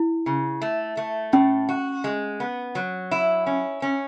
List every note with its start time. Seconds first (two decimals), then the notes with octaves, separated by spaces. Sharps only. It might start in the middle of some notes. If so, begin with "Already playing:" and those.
Already playing: E4
0.26 C#3
0.62 A3
0.97 A3
1.33 A2 C#4
1.69 F#4
2.04 G#3
2.40 B3
2.75 F#3
3.11 E4
3.46 C#4
3.82 C#4